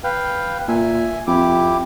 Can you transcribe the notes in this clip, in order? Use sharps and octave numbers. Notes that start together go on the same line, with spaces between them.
B4 F5 G5
A#2 E5 G#5
F2 E4 G4 D6